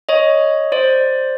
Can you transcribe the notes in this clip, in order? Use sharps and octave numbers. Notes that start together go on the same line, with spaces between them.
C#5 D#5
C5 D5